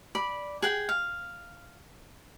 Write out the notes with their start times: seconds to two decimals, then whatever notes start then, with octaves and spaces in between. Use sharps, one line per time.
0.15 D5 B5
0.62 G#4 F#5 G5
0.89 F5